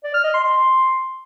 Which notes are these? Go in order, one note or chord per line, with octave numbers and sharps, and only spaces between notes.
D5
F6
D#5
C6
C6